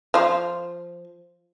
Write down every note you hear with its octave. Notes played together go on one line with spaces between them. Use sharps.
F3 F4